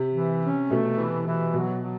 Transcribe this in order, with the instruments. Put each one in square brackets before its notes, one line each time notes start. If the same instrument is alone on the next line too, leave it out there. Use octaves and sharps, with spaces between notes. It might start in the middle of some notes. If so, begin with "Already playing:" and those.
Already playing: [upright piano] C3
[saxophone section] E3
C#4
[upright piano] B2 [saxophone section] A3
[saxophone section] E3
E3
[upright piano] B2 [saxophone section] F#3
[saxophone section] F#3